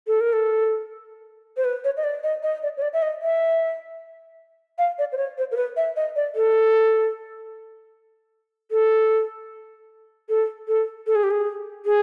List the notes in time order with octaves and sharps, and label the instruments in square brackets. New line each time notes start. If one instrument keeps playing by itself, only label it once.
[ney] A4
A#4
A4
C5
B4
C#5
D#5
D5
D#5
D#5
D5
C#5
D5
E5
D#5
E5
F5
D5
C5
C#5
C5
A#4
B4
E5
D#5
D5
A4
A4
A4
A4
A4
G#4
G4
G#4
G#4